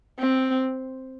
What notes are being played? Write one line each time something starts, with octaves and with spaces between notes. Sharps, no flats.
C4